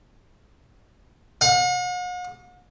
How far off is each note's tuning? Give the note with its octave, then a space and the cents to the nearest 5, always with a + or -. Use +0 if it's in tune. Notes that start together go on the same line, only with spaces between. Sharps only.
F#5 -45